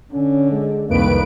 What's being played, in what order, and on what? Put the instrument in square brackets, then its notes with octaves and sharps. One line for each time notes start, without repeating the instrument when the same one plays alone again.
[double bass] D3 [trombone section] C#4
[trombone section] G#3
[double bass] C2 F2 [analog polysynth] D#3 B4 D7 [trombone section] A#3